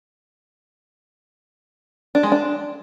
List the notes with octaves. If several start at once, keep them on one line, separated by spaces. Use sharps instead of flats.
D4
G#3
D4